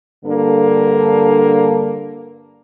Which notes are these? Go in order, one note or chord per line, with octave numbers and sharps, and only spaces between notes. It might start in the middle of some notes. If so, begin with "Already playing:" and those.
G2 D3 A#3 A4